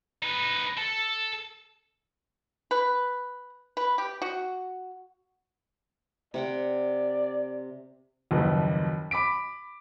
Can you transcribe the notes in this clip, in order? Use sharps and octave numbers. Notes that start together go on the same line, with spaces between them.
D#4 B4
A4
B4
B4
G4
F#4
C3 D5 F#5 G5
F#1 D#2 F3 B4
B5 D6 B6 D7